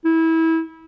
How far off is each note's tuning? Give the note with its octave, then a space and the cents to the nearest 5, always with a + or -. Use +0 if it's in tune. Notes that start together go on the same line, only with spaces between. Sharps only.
E4 -25